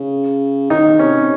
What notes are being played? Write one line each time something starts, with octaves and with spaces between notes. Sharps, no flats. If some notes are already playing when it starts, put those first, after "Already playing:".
Already playing: C#3
D#3 D#4
C3 C#4